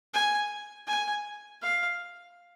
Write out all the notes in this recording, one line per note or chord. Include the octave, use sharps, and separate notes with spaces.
G#5
G#5
F5